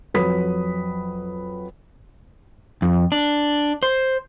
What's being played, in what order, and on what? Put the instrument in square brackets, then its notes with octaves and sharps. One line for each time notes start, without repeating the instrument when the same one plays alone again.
[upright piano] F2 F#3 B4 B5 D#6 B6
[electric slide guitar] F2
D4
C5